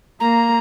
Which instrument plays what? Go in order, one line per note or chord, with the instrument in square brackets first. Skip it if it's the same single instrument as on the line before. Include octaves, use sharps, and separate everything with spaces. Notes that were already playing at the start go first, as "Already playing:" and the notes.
[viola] A#3 [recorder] A#5